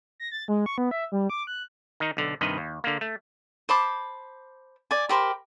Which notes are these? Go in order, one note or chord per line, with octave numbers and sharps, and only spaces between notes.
A#6
A6
G#3
C#6
B3
E5
G3
D6
F#6
D#3 D#4
B1 D3
G2 C3 D#3 B4 D#5
D#2
D3 A#3
A3
C5 A5 B5 D6
D5 G#5
G4 A#4 C5 B5